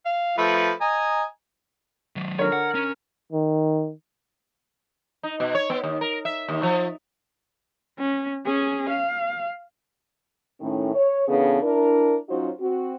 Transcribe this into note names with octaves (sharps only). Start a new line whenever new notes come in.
F5
F3 A3 B4
D#5 G#5 A#5
D#3 F#3
D3 A#4 C#5
F#5
C#4
D#3
D#4
B2
C#5
B3
D#2
A#4
E5
D#2
F3
C#4
C#4 G#4
F5
A2 D#3 C#4
C#5
C#3 E3 B3 D4 G#4 A4
D4 E4 A#4
F#3 C#4 D#4 F4 F#4 C5
C4 F#4